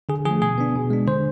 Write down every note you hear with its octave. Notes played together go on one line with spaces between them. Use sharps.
D3 G#4
F3 A3 G#4
B2 G#4
B3 D4
B2
G#3 D4
D3 C5